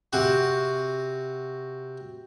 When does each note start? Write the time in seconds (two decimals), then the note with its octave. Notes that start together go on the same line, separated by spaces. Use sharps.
0.13 C3 F#4